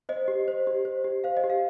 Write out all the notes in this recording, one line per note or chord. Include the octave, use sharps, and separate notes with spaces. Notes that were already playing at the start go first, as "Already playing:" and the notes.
C5 D#5
G4
C5
G4
C5
G4
C5 F5
D#5
G4
F5